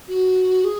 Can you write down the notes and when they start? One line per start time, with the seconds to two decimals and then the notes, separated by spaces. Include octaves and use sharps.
0.08 F#4
0.64 G#4